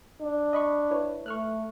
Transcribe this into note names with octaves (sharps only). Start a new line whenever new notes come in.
D4
D#5 B5 C#6
E4 B4 C#5
A3 C#6 F6 F#6